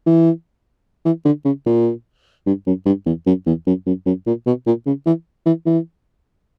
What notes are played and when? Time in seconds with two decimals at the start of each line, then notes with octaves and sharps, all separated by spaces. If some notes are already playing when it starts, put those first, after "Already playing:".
0.06 E3
1.06 E3
1.25 D3
1.45 C#3
1.66 A#2
2.46 G2
2.67 F#2
2.86 G2
3.06 E2
3.27 F#2
3.47 E2
3.67 F#2
3.86 F#2
4.06 F#2
4.27 A#2
4.46 B2
4.67 A#2
4.86 C#3
5.06 E3
5.46 E3
5.66 E3